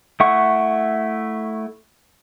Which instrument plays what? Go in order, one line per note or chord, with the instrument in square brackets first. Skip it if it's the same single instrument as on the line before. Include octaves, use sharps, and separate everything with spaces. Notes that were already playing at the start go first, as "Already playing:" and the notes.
[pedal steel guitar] A3 E4 F#5 C#6